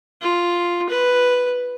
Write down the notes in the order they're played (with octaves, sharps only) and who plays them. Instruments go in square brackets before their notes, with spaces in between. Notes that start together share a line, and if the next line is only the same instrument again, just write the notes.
[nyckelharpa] F4
B4